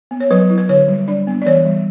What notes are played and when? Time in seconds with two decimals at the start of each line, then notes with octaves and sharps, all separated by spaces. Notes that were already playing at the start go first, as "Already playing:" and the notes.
0.11 B3
0.21 C#5
0.31 F#3 B4
0.50 E4
0.58 B4
0.69 D3 C#5
0.88 G3
1.07 D4 D5
1.27 B3
1.42 D5
1.46 E3 C#5
1.65 G3